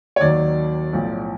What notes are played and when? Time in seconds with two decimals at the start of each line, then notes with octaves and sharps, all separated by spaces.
0.16 C#5
0.20 D#2 D#3 F#3 D5
0.93 B1 A2 F3